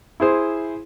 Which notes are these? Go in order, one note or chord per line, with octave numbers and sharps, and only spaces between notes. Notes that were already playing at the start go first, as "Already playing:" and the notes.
E4 G#4 C5